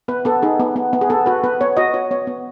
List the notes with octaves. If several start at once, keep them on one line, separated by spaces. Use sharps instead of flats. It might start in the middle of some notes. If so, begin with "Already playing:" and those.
B3 B4
B3 A4
D#4 G#4
B3
B3
B3
G#4
B3 A4
F#4 B4
B3 B4
B3 C#5
F#4 D#5
F#4 C#5
B3 C#5
B3